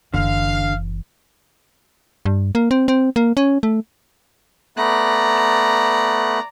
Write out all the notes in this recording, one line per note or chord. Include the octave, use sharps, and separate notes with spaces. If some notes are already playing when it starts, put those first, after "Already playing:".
F#1 D3 E3 F5
G2
A#3
C4
C4
A#3
C#4
A3
A3 B3 D5 A#5 F#6